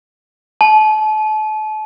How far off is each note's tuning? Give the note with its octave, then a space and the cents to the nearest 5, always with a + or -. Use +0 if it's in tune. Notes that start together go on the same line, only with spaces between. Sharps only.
A5 -35